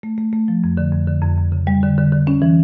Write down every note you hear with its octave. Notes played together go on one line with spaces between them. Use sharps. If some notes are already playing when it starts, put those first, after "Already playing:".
A3
A3
A3
F3
F2
D3
F2
D3
F2
F2
C#3
G3
D3
D3
D3
C#4
E3